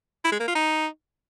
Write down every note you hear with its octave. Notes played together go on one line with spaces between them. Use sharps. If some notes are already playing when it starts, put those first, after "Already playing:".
E4
G#3
A#3
F4
D#4